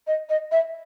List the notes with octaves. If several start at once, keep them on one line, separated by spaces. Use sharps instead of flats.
D#5
D#5
E5